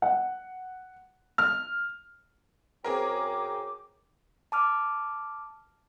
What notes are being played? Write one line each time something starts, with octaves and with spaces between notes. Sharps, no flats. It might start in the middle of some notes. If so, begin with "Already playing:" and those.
F#5
F6
F#2 C4 G#4 A#4 G5 D6
A5 D6 F6